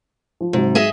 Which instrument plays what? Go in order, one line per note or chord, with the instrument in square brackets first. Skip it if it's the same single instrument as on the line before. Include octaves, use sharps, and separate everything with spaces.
[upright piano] F3
[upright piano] G#2 F#3 [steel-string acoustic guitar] C3
[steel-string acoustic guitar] G#4 D#5 E5